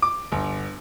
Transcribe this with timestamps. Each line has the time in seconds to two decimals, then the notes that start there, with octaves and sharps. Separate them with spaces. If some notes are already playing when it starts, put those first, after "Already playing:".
0.02 D6
0.32 G1